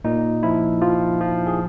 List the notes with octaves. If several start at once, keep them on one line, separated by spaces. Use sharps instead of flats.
A#2 D#4
F3 E4
F3 F4
F3
G#4